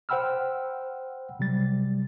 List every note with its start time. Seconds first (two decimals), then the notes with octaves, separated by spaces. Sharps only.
0.09 C5 F#5 G5 B5 E6 F6
1.39 C3 F#3 G3 A6